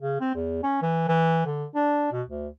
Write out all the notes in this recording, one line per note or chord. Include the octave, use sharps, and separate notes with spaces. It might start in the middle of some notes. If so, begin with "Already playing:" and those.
C#3
C4
E2
C#4
E3
E3
D3
D4
B2
D2